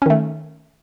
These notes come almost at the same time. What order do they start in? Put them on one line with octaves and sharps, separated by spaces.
C#4 D#3 A3